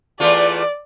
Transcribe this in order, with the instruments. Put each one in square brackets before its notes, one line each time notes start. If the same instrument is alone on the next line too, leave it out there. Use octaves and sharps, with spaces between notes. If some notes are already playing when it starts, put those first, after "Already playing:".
[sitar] E2 A3 F4 [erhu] D5